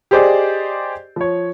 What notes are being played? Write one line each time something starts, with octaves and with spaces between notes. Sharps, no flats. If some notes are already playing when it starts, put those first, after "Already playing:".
G4 G#4 C5 D5 D#5
F3 C#5